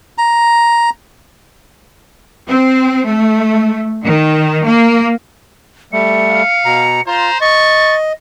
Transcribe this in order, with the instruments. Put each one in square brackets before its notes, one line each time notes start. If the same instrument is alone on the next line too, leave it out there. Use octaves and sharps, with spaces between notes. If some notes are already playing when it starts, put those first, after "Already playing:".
[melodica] A#5
[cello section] C4
A3
D#3
A#3
[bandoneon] G3 A3 [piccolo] C#7
[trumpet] F5
[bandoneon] B2 A#5
[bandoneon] F4 [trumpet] C5 [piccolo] A#5
[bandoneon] D#5 [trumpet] C#6 [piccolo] A6